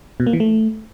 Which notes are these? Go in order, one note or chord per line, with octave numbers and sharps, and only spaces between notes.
B2
A#3
E3
A3